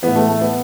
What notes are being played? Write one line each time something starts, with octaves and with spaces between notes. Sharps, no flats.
A2 E3 B3
A3
A3
B3